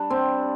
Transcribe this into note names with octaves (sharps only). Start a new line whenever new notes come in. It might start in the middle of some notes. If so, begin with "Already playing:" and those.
Already playing: G3 D4
C4